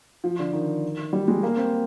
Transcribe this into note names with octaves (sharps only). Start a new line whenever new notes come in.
F3
D3
D#3
G3
G#3
A#3
C4